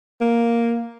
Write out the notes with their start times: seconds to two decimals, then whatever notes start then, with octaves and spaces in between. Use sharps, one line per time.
0.21 A#3